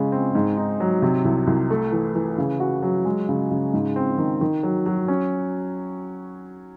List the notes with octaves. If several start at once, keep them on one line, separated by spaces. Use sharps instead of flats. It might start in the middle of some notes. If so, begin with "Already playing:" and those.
Already playing: C#3 G#3
C4
G#2
D#4
F#3
C3
C2
C2
A3
E3
E3
C#3
F#4
F#3
G#3
C#3
C#3
G#2
C4
D#3
D#3
F#3
F#3
C#4